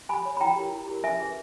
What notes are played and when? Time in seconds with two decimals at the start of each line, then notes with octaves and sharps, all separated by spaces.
0.09 G4 G#5 B5
0.25 C#5
0.37 B5
0.40 E4 G5 A#5
0.56 G4 A#4
0.72 E4
0.88 G4 A#4
1.03 C#4 E5 G#5
1.20 G#4 B4